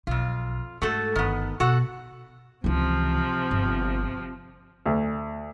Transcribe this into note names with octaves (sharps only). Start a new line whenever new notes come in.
B1 F2 F4
G#2 A3 F#4 A4
G1 D#3 B3
B2 F#4 A4 F#5
C#2 C3 E3 F3
G1
D2